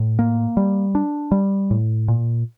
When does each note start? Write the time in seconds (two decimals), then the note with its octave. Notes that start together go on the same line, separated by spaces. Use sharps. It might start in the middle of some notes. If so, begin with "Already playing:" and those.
Already playing: A2
0.19 A#3
0.57 G3
0.95 D4
1.32 G3
1.71 A2
2.08 A#2